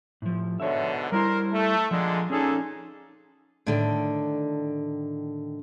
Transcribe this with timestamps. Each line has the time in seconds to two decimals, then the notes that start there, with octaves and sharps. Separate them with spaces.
0.22 A2 F3
0.60 G#2 B2 D3 C#5 E5
1.12 G3 E4 A#4 C5
1.53 A3
1.91 A#2 D3 F3 G#3
2.30 A#2 C#4 D#4 G#4 A4
3.66 A2 D3 D#3